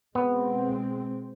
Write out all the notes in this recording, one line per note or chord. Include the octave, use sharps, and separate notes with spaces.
B2 G#3 B3 C4